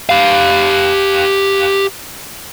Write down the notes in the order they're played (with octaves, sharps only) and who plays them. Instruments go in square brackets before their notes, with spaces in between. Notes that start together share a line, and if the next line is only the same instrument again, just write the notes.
[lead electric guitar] G4 F5